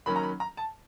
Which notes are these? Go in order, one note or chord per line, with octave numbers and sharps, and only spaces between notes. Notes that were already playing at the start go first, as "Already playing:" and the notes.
D#3 F#3 A#3 C#4 B5
A#5
B5
A#5
A5